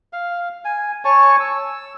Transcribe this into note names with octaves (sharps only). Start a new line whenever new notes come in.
F5
G#5
C#5 G#5 A5 C#6
E6